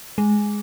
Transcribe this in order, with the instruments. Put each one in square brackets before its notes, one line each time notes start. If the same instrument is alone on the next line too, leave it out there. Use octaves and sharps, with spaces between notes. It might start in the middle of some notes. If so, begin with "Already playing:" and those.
[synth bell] G#3